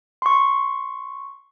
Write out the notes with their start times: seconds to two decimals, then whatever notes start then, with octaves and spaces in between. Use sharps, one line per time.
0.22 C6 C#6